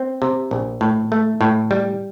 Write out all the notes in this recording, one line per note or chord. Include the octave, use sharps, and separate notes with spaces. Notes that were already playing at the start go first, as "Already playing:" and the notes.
Already playing: C4
C3
A#1
A2
A3
A2
G3